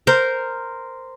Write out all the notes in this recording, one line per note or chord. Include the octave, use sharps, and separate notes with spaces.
A#4 C5